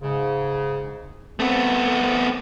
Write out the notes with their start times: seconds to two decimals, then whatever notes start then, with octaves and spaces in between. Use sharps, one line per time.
0.02 G#2 C#3
1.40 A3 B3 C4